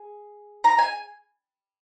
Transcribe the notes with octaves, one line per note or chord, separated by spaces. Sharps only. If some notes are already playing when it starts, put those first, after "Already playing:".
Already playing: G#4
A#5
G#5